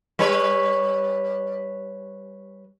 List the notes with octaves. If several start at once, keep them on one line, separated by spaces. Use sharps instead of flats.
G3 B4 C#5